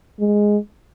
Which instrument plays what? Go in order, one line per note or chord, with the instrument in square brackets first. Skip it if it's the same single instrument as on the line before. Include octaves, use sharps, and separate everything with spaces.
[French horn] G#3